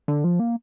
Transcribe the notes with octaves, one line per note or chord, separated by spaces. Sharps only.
D3
F3
A#3